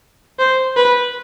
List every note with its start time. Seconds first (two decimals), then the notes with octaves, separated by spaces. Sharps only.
0.39 C5
0.77 B4